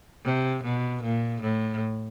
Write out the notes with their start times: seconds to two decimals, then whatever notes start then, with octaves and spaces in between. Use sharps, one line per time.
0.25 C3
0.64 B2
1.03 A#2
1.42 A2